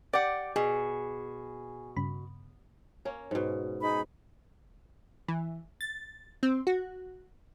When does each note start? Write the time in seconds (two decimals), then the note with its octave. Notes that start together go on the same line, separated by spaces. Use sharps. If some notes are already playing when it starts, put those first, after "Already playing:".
0.13 G4 D5 F#5
0.56 B2 G#4
1.97 G2 C#3 B5
3.05 A#3 C#4
3.31 G#2 B2
3.81 D#4 G#4 B5
5.28 E3
5.81 A6
6.43 C4
6.67 F#4